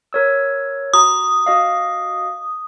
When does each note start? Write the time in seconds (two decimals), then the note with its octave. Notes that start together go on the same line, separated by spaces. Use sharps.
0.13 A#4 C#5 E6
0.94 F#4 A#5 D#6
1.46 F#4 D#5 F5